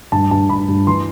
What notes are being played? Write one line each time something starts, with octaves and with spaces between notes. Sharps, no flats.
G2 A5
G2 A5
G2 B5
G2
E3 C6